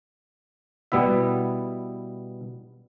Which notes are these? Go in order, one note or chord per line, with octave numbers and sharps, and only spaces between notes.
B2 G3 B3 E4 E5